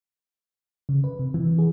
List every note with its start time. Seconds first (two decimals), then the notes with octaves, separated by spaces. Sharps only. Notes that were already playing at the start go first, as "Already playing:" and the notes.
0.89 C#3
1.04 B4
1.19 C3
1.34 E3
1.58 G#4